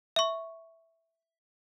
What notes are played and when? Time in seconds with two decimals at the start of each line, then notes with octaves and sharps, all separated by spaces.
0.16 E5 C#6